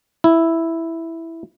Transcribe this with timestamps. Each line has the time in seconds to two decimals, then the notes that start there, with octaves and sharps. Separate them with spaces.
0.24 E4